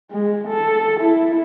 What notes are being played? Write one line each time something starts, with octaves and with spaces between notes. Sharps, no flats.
G#3
A4
E4